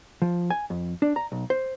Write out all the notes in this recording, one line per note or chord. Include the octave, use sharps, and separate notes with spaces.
F3
G#5
F2
D4
A#5
B1
C5